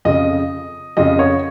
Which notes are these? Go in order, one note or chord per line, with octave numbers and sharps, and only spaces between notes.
F2 C#3 D#5
F2 C#3 D#5
C#5